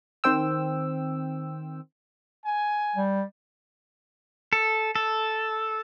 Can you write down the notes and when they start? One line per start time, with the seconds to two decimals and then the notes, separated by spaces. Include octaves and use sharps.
0.24 D#3 C4 C5 G5 E6
2.45 G#5
2.96 G3
4.53 A4
4.96 A4